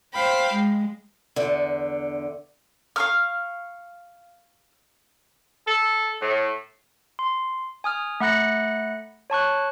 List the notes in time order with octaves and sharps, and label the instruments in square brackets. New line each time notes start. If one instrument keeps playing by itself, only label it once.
[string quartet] C5 F5 G5 B5
G#3
[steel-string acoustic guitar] E2 D3
[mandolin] F5 C#6 F6
[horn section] A4
A2
[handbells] C6
G#5 D#6 F6
A3 F#5 B5 F#6 A#6 C#7
C#5 A5 C#6 F#6